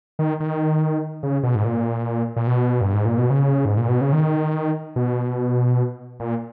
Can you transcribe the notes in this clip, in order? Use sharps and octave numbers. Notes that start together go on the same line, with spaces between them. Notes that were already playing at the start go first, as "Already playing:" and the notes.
D#3
D#3
C#3
B2
G#2
A#2
A#2
B2
G2
G#2
A#2
B2
C#3
G#2
A#2
B2
C#3
D#3
B2
A#2